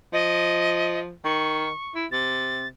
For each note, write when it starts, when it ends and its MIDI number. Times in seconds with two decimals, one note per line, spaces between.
0.13 1.13 53
0.13 0.99 75
1.24 1.70 51
1.24 1.94 85
1.95 2.06 64
2.12 2.68 48
2.12 2.68 93